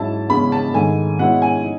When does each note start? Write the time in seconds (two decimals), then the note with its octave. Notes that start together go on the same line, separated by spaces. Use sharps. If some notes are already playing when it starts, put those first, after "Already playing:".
Already playing: G#2 F#3 C#4 E4 A5
0.30 E2 C#3 G#3 C#4 B5
0.52 A5
0.74 G#2 D#3 A3 G#5
1.19 B2 G#3 C#4 E4 F#5
1.42 G#5
1.64 D#4